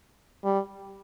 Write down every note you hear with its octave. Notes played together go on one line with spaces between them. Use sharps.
G3